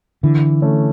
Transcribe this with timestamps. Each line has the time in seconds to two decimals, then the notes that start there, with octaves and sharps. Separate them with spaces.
0.23 D3 E3
0.62 A3 C#4